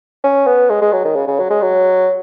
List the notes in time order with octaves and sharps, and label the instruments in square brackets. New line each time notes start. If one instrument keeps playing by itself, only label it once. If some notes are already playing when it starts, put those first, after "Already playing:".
[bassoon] C#4
B3
G#3
G#3
F#3
D#3
C#3
C#3
F#3
G#3
F#3